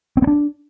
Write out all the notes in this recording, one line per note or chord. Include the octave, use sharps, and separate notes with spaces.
C4
B3
D4